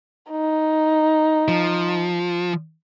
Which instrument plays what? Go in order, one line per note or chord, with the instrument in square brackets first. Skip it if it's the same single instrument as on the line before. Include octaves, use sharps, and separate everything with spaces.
[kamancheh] D#4
[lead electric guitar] F3